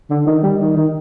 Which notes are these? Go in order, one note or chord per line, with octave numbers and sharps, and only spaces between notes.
D3
D#3
G3
D#3
D#3